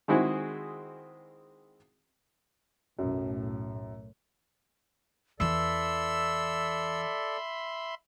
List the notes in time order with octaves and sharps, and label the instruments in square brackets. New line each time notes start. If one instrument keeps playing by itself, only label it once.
[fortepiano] D#3 G#3 C4 E4 F#4 G#4
[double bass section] B1 A2 [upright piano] F#2
[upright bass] E2 E3 [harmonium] A4 D5 [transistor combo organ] E5 B5 C6 [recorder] E6